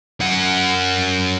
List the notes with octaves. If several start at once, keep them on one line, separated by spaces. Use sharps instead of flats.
F#2 F#5